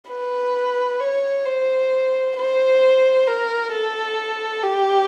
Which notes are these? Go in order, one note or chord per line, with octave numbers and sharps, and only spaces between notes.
B4
C#5
C5
C5
A#4
A4
G4